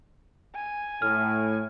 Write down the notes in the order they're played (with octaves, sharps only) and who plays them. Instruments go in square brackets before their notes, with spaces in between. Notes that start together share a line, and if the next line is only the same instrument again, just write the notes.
[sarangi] G#5
[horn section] A2 [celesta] F6